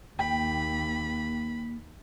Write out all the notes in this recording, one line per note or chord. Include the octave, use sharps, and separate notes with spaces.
D#2 A#3 G5 B5